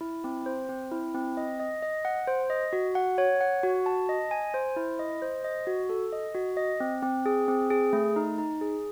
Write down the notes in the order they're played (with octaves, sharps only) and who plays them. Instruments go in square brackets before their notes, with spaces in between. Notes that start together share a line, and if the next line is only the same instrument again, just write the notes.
[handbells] E4
C4
C5
C4
E4
C4
D#5
D#5
D#5
F#5
C5
D#5
F#4
F#5
C#5
F#5
F#4
A5
D#5
G#5
C5
E4
D#5
C5
D#5
F#4
A4
D#5
F#4
D#5
C4
C4
G#4
C4
G#4
A3
D#4
D#4
G#4